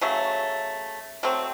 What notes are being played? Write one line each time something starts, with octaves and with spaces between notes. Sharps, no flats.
C#3 F#3 A3
F#3 A3 C4